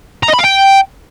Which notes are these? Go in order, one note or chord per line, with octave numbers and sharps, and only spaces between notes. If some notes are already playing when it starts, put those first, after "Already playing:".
A#5
D#5
B5
F5
G5